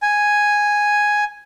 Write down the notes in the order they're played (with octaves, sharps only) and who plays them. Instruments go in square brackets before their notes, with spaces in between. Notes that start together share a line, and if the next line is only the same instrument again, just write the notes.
[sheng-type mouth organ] G#5